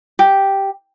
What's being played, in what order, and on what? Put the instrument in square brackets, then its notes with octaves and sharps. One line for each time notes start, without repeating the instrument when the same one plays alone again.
[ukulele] G4